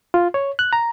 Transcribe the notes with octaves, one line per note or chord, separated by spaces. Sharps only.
F4
C#5
F#6
A#5